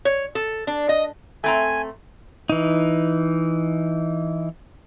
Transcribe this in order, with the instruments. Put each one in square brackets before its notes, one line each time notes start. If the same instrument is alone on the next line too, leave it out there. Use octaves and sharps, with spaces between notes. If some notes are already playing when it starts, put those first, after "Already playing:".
[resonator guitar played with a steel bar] C#5
A4
D4
D#5
[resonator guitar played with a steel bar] A3 C4 A#5 [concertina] G#5
[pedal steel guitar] E3 D#4